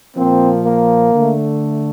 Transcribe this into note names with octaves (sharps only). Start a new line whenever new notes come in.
A#2 F3 A#3 C4
A#3
D3 A3